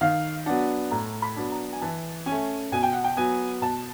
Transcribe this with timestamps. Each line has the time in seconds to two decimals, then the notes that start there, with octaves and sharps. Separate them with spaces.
0.01 D#3 F5
0.46 F#3 B3 D4 F#5
0.91 A2 A#5
1.22 B5
1.36 F#3 B3 D4
1.51 A#5
1.73 G#5
1.82 E3 A5
2.26 C#4 G#5
2.31 A3
2.72 B2 G#5
2.83 G5
2.93 F#5
3.04 G5
3.17 F#3 B3 G#5
3.61 B2 A5